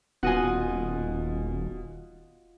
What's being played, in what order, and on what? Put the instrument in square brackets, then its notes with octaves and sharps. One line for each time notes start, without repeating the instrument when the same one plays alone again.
[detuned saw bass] D#1 [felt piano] B2 G#5 [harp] F4 D#5 F#5